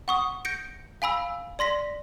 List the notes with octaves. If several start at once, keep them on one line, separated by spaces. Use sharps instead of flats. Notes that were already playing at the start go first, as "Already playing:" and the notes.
F#5 C#6 D#6
G6 A#6 C#7 D7
F5 G#5 B5 E6
D5 C6 A#6 B6